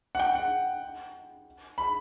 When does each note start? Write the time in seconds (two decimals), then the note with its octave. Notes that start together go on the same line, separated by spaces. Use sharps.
0.15 F#5
0.20 G5
0.35 F#5
1.78 B5